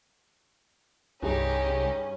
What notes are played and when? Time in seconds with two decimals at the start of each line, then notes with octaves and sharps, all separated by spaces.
1.22 C2 G2 C#4 D#4 G4 G#4